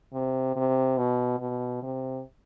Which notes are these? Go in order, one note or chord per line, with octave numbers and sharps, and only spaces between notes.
C3
C3
B2
B2
C3